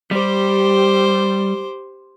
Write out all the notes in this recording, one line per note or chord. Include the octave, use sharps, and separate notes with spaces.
G3 G4 C5